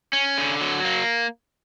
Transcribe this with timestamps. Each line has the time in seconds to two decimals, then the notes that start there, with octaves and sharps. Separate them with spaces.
0.13 C#4
0.38 D3
0.61 F#3
0.85 A#3